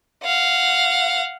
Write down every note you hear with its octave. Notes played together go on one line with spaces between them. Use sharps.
F5 F#5